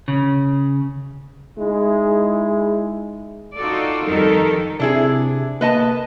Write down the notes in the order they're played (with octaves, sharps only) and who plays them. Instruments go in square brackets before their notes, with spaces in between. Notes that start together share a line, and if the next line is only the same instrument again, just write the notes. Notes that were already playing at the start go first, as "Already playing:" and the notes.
[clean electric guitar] C#3
[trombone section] G#3 D#4 E4 G#4
[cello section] D#4 F4 F#4 A4 D5
F2 D#3 G3 D#4 A4 A#4
[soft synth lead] C3 [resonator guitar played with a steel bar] D4 E4 G#4
[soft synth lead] A#3 [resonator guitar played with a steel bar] B4 D#5 A5